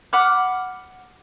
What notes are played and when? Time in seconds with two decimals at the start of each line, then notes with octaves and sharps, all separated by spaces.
0.13 F#5 B5 D6 F6